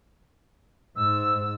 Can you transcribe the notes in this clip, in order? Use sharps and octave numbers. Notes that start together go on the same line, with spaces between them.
G#2 E6